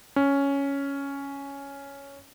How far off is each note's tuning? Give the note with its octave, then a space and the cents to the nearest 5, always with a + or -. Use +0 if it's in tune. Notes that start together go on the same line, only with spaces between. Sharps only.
C#4 +5